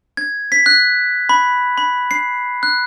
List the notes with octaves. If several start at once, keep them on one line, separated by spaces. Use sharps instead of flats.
G#6
B6
F#6
B5
B5
C7
F#6